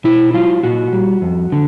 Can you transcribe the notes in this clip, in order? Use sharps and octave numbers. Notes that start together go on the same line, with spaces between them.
B2 E4
F#3 F4
A#2 F#4
G3
F2
D3